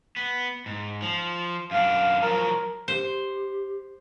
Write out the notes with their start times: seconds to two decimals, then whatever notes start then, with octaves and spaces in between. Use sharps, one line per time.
0.16 B3
0.66 G#2
1.02 F3
1.71 F#2 D4 F5
2.22 F3 F#3 A#4
2.88 G4 C5